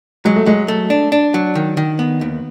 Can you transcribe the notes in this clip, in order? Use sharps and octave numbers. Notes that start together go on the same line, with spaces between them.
F#3 G#3
A3
F#3 G#3
A3
D4
D4
F#3
D#3
D#3
B3
D#2